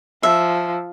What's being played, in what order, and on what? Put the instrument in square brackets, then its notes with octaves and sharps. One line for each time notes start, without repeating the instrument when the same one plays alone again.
[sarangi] F3 [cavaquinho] E5